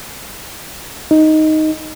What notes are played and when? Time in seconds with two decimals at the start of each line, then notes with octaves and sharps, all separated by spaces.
1.11 D#4